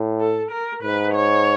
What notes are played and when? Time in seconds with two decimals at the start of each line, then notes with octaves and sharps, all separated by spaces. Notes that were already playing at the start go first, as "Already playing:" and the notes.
Already playing: A2
0.20 A4
0.51 A#4
0.82 G#2 B4
1.14 C#5